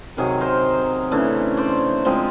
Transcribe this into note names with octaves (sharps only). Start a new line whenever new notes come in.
C3 D#3 F#3 G#4 A#4
A#4 C5
C#3 E3 A3 D4
C5 D5
F3 G#3 C4